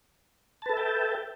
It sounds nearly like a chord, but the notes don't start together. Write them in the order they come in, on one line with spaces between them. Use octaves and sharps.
A5 B4 A4 E5 G5